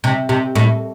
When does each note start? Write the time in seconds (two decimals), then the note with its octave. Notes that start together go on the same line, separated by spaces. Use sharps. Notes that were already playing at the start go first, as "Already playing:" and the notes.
0.04 C3
0.29 C3
0.55 A2